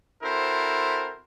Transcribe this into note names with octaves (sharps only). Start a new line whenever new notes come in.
C4 E4 F#4 A4 A#4 C5